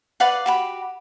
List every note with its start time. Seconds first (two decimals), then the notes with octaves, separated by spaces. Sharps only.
0.20 B4 D5 F5 F#5
0.46 F#4 G4 B5